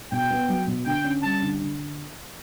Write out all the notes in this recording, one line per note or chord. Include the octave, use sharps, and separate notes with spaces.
B2 G5
B3
F#3
B2
D3 G5
C#4
G3 A5
D3
D3